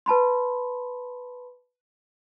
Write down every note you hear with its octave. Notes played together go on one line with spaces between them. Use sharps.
B4 A5 B5 C6